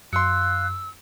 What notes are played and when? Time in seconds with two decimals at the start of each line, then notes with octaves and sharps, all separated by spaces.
0.13 F#2 F5 C6 E6 F#6 C#7